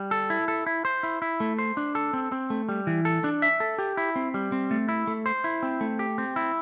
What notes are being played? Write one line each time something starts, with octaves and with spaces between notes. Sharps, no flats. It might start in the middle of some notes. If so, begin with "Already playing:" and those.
Already playing: G3
A4
E4
A4
E4
C5
E4
E4
A3
C5
D4
A4
C4
C4
A3
G3
E3
A4
D4
E5
A4
G4
E4
C4
G3
C4
A3
E4
A3
C5
E4
C4
A3
G4
C4
E4